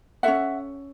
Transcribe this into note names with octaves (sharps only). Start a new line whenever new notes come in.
C#4 F4 A4 E5 F#5